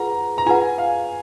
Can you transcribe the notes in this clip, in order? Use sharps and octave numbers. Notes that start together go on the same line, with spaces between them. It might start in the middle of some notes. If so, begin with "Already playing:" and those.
Already playing: F4 G#4 B4 F#5 A#5
A#5
F4 G#4 B4 F#5 G#5
F5